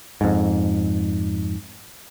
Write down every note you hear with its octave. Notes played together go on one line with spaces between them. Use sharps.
F2 G#2